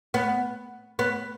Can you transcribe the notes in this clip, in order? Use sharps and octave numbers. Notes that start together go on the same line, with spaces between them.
B3
B3